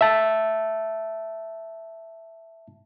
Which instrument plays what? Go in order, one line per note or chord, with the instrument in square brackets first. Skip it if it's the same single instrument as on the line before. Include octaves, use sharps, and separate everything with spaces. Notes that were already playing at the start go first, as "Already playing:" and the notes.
[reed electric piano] E5 A5